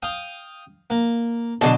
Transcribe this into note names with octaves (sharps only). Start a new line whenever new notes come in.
F5 G5 D#6
A#3
B2 D3 F#3 A5